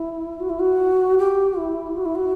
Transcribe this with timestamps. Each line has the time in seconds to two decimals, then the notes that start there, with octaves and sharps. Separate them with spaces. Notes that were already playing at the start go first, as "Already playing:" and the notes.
Already playing: E4
0.40 F#4
0.50 E4
0.60 F#4
1.18 G4
1.58 E4
1.97 F#4
2.05 E4
2.15 F#4